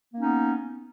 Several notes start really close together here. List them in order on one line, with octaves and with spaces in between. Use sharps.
A#3 C#4 D#4 B3